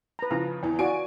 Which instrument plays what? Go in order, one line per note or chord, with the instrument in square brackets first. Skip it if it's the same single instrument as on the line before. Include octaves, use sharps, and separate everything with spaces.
[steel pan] B4 A#5
[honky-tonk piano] C#3 F3 [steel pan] A#5
[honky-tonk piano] E2 E3
[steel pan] F4 F#4 D5 [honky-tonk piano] G#5 D7